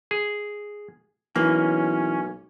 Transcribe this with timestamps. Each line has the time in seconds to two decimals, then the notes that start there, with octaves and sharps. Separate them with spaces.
0.11 G#4
1.36 B1 E3 A#3 C#4